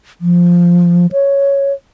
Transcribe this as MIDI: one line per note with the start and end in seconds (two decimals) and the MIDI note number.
0.21 1.07 53
1.12 1.73 73